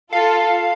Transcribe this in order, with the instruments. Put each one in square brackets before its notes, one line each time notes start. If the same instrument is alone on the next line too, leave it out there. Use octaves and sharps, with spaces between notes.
[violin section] F4 A4 [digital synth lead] F5